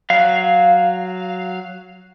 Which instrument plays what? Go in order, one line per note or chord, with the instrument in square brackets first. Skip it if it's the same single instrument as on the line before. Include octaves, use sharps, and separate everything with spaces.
[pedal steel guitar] F#3 F5